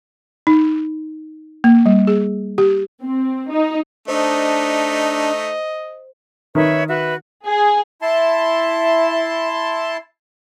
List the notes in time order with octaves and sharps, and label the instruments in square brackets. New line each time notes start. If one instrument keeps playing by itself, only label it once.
[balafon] D#4
A#3
G3
G#4
G4
[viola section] C4
D#4
[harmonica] A3 D#4 [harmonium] D4 [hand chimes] C5 [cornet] D#5
[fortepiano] D#3 [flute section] B4 C#5 E5
[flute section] F#4 B4 E5
[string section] G#4
[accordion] E4 A5 C6 [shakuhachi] E5